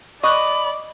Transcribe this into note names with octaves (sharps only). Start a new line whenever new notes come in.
D5 D#5 B5 C#6 D6 F#6